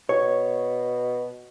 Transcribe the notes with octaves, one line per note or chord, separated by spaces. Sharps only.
B2 C#5